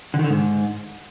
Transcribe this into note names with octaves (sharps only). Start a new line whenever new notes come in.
D3
D#3
D3
G#2